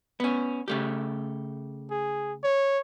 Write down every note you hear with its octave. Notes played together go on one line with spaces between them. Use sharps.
B3 C#4
C#3 A3 G4
G#4
C#5